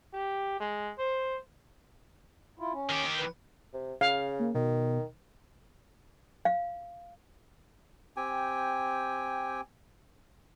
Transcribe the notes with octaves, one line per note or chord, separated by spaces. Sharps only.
G4
G#3
C5
E4 F4
C#4
D#3 G4
B4
C3
C#3 F5
A#3
B2 D#3
F5
C4 G4 G5 G#5